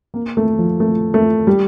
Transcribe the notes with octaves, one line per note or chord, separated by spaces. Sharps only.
A#3
A3
F3
A3
A3
G3